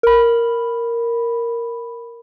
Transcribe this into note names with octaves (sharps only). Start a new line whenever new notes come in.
A#4 B5